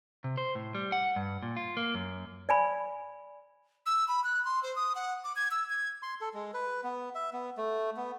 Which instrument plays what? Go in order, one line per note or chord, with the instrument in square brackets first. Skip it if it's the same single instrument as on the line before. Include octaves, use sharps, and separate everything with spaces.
[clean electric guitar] C3
C5
A2
G3
F#5
G2
A#2
F4
A#3
F#2
[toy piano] D5 G#5 B5
[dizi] E6
B5
F#6
C6
C5
D#6
F#5
D6
G#6
E6
G#6
[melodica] C6
A4
G#3
B4
B3
E5
B3
A3
B3